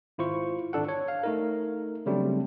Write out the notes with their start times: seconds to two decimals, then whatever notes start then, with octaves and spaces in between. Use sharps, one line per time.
0.18 G#1 E4 F4 C5 C#6
0.73 G#1 D4 A4 F#5
0.89 C#5
1.08 F5
1.23 A3 D#4 A#4
2.06 C#3 F#3 G3 A3 C4 D4